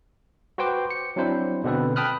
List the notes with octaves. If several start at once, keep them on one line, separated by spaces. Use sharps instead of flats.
F#4 B4 C5 G5 C6 D6
C#7
F#3 C4 D4 E4 C5
B2 D3 C4 A4 B4
G5 A5 B5 D#6 F6 F#6